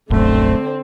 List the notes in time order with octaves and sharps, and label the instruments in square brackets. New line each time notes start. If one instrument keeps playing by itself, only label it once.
[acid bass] D1 [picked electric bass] A#1 F#2 [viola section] D3 C4 [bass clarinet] A3